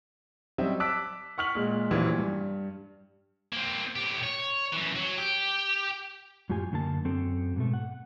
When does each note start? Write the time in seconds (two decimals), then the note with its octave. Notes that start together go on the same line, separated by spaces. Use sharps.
0.58 F#3 G3 C4 D#5 E5
0.80 A5 D6 E6 F#6 B6 D7
1.38 F#5 C#6 F6 B6 F#7
1.55 A#2 G#3
1.91 A#1 D#2 A#2 E3 F#3
2.18 G2
3.53 A#3 C4
3.96 A2 G4
4.23 C#5
4.72 F#2 E3
4.95 F#3
5.18 G4
6.49 F#2 A2 F4 G4 G#5
6.72 F#2 D3 A#3 A5
7.05 F#2 C4 A4
7.56 G#2 B2 A3
7.74 F#5